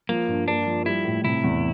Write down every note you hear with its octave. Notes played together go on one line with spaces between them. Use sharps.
F3 A#3
G2
A#3 D4
F3
G3 E4
A2
C3 E4
E2